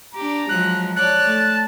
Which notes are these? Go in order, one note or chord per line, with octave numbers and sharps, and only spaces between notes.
D4 G4 A#5
F3 F#3 G#3 F#6
C#5 D5 A5 F#6
A3